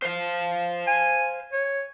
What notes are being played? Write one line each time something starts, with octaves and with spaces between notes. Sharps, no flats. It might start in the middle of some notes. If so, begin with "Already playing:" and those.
C5 F5
G#5
C#5